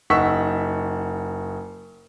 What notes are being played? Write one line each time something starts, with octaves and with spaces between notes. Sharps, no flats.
F#1 D#4 F#5 C#6 E6 B6